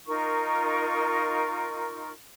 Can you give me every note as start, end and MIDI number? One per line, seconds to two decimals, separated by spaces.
0.06 2.12 63
0.06 2.12 65
0.06 2.12 70
0.06 2.12 85